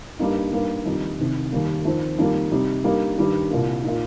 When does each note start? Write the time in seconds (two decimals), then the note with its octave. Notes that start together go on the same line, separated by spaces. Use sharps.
0.19 G2 G3 A#3 D#4
0.53 G2 G3 A#3 D#4
0.86 F2 D#3 G3 D#4
1.19 C2 C3 D#3
1.52 D#2 D#3 G3 A#3
1.85 F2 D#3 C4
2.19 F2 D#3 G3 A#3
2.51 C3 G3 D#4
2.84 G2 G3 A#3 D#4
3.18 G2 D#3 G3
3.51 C2 A#2 A#3
3.84 A#2 A#3 D#4